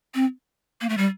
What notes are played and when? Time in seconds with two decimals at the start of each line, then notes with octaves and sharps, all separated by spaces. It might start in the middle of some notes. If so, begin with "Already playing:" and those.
0.15 C4
0.81 A#3
0.89 A3
0.98 G3